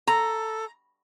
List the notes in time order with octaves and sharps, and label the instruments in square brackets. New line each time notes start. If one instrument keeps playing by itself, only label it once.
[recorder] A4 [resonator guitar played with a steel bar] A#5